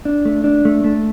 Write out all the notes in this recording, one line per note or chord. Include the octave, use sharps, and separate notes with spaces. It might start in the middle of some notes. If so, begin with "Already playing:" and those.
D4
A3
D4
A3
A3